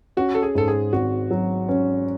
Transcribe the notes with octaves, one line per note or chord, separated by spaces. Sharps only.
C#4 F#4
A4
G#4
G#2 A4
G#4
G#1 F#4
F#3
C#4